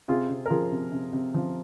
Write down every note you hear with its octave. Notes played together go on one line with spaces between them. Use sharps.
C3 F4 G#4
C3
A#4
F3 F4 G#4
C3
C3
C3
F3